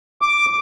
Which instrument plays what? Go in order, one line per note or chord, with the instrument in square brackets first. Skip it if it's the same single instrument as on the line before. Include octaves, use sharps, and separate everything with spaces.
[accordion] D6